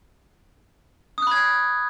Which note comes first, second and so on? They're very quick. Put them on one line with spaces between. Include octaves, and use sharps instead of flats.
D#6 F#6 B5 G#6